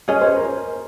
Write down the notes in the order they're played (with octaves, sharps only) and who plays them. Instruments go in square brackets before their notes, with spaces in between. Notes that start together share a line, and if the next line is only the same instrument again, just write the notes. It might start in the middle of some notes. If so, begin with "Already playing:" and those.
[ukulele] C#4 G#4 D#5 [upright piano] G#5
[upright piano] C5
A#4